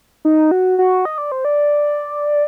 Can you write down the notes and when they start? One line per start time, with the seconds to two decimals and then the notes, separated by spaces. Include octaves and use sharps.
0.25 D#4
0.51 F#4
0.79 F#4
1.05 D#5
1.18 D5
1.32 C5
1.45 D5